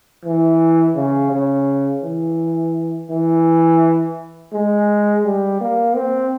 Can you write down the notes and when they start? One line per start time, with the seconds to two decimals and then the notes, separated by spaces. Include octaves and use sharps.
0.25 E3
0.96 C#3
1.32 C#3
2.03 E3
3.10 E3
4.53 G#3
5.25 G3
5.61 A#3
5.96 C4